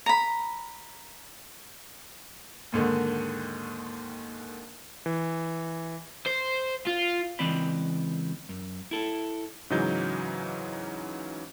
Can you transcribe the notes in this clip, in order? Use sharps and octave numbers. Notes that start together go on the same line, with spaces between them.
A#5 B5
D#2 G#2 D3 D#3
E3
C5
F4
C#2 E3 C4 D5 D#5 B5
F#2
E4 A4
G#2 C#3 E3 F#3 D#4 G6